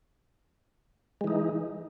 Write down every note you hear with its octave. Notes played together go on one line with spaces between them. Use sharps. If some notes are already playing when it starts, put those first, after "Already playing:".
E3 G#3 D#4